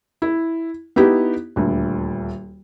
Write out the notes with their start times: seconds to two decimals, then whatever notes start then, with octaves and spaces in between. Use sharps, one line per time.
0.22 E4
0.96 B3 D#4 E4 G4
1.56 D#1 D2